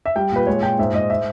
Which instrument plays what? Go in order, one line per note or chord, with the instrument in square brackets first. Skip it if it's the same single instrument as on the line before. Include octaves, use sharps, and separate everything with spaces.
[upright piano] E5
G3 G5
A#2 B4
G#3 C#5
A#2 G5
G#2 E5
G#2 D#5
E5